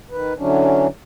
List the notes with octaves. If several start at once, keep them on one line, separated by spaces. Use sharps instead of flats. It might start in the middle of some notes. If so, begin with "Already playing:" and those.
D#3 B4
D3 E3 F#3 C#4 D4